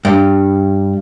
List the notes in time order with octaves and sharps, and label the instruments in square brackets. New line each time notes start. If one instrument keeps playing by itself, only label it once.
[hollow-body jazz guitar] G2